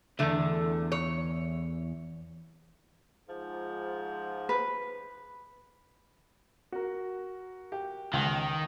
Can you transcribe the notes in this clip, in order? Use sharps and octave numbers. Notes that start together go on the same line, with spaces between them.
B1 E2 D3 A3
C#5
G#2 F3
B4
F#4 A#4
G4
C#2 D#3